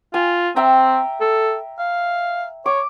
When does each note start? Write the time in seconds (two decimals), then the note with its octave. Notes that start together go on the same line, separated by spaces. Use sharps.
0.14 F4 G#5
0.56 C4 E5 G5 A#5
1.21 A4
1.79 F5
2.66 C#5 D6